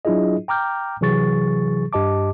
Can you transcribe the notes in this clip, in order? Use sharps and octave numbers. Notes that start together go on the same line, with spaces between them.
F#3 D4 E4 F4 G#4 D#5
G5 A#5 D6 F6 G6
C3 E3 F#3 G#4 C#6 A6
G2 G4 D#5 A5 D6